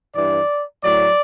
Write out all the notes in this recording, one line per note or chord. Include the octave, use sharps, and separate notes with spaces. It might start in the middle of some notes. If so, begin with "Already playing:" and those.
G2 E3 D5
A2 F#3 D5